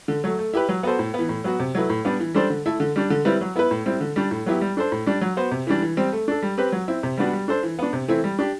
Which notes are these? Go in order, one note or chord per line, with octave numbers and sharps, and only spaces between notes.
D3
F#3 A3
A3
E4 G4 B4
F#3
B3 F#4 A4 C5
A2
B3
E3
A2
F#3 B3 F#4
C3
F#3 A3 E4 B4
A2
G3 B3 D4
E3
G3 D4 A4 C5
D3
A3 E4 A4
D3
G3 D4
D3
G3 C4 E4 B4
F#3
B3 E4 B4
A2
G3 C4 E4
D3
G3 D4
A2
F#3 B3 E4 G4
G3
D4 A4 C5
A2
G3 D4
F#3
B3 F#4 C5
C3
E3 G3 D4
E3
G3 C4
A3
D4 A4
G3
C4 G4 B4
F#3
C4 E4
C3
G3 B3 D4 F#4
G3
D4 A4 C5
E3
B3 D4
C3
E3 A3 C4 E4
G3
D4 G4